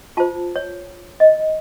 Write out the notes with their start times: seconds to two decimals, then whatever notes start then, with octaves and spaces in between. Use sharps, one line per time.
0.17 F4 C5 A5
0.56 C#5
1.20 D#5